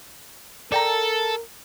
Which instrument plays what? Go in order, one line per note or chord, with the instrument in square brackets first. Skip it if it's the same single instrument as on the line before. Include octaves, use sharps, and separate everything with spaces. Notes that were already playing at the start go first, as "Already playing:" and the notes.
[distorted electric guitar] A4 [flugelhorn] A#4 [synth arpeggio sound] D5 G5 A#5